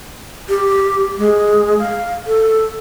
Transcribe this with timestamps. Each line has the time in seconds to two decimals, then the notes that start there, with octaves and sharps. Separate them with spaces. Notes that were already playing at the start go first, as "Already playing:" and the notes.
0.49 G4
1.18 G#3
1.79 F5
2.27 A4